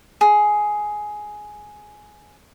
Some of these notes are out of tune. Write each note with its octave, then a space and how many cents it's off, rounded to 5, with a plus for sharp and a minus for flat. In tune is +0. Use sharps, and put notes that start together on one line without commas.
G#4 +10